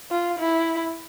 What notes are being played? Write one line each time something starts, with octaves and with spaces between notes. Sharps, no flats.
F4
E4